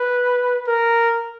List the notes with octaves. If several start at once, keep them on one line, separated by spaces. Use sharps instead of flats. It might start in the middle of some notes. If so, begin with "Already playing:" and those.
Already playing: B4
A#4